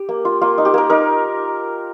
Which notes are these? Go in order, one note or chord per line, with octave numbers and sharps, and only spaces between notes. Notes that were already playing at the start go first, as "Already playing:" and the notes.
Already playing: G4
A#3
F4
A#3 F4
D#4
G4
A#3 A#4
D#4 A#4